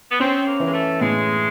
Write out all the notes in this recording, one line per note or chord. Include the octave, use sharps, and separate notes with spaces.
B3
C4 C#4
A#3
E3 G#3
A3
A2 G#3